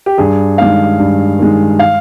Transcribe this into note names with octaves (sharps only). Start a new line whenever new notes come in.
G4
G2 G#4
D#3 G#3 F5
G2
D#3 G#3
F5